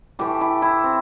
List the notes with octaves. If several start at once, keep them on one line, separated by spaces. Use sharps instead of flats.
A2 E3 A3 G4
E4
E4
C4